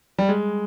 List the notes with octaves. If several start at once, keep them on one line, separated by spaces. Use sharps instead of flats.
G3
G#3